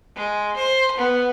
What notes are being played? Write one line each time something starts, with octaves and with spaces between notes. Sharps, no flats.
G#3
C5
B3